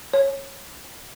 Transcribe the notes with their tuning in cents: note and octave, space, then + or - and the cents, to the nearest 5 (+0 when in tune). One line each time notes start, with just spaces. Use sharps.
C#5 -15